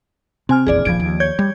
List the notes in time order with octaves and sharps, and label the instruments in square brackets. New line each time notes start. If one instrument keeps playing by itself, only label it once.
[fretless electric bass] C3 [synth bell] C4 G#5 F6
[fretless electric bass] F1 A#1 E2 [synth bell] G#4 D5
[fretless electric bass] F1 A#1 D#2 [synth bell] F3 G#6 D7
[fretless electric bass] D#2
[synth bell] C#5 G6 G#6
[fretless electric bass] G3